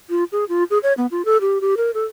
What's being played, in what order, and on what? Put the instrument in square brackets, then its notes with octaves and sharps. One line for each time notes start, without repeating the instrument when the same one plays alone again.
[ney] F4
G#4
F4
G#4
C#5
B3
F4
A4
G4
G4
A#4
A4